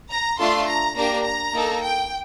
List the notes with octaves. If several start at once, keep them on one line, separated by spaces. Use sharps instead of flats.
A#5
A3 D4 F4 A4 C6
A#5
A#3 D4 G4 A#5
A#5
A#3 D#4 A4
G5